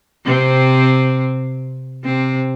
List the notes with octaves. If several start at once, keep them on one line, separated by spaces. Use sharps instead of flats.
C3 C4
C3 C4